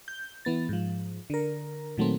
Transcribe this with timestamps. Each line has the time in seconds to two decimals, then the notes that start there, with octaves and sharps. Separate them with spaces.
0.08 G6
0.45 E3 B3 A6
0.69 G#2 F3
1.30 D3 A#4
1.97 A#2 D#3 F#3 A3 A#3 C4